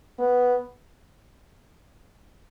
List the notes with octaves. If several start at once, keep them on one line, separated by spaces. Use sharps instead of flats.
B3